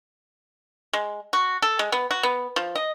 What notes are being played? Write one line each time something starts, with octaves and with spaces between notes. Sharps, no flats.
G#3
F#4
A4
G#3
B3
F#4
B3
F3
D#5